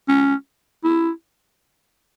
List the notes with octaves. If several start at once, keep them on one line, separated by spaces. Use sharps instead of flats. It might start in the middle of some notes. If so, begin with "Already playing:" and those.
C#4
E4